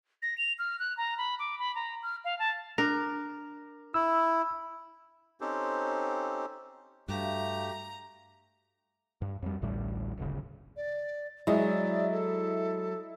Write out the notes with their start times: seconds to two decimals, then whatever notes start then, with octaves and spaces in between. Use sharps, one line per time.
0.22 A#6
0.38 F7
0.59 F6
0.79 F#6
0.97 A#5
1.18 B5
1.39 D6
1.59 B5
1.75 A#5
2.03 F6
2.25 F5
2.39 A5
2.78 D4 A#4
3.94 E4 E6
5.41 C4 C#4 D#4 G4 A4 C5
7.08 G2 A3 F#4 G4 E5 F5 A#5
9.22 G2
9.42 F2 G3
9.62 A1 D2 A2 G3
10.18 D1 G1 C#3
10.77 D5
11.47 F#3 G#3 E4 D5 D#5
12.11 A4